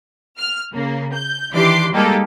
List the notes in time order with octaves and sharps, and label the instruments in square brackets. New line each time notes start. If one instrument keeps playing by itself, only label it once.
[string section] F6
C#3 A#3
G6
D#3 E3 D4 G4 C6 D6
G3 G#3 A#3 D#4 G4 A4